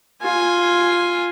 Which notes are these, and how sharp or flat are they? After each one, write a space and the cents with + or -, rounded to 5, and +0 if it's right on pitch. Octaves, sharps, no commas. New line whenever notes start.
F4 +0 G#5 +0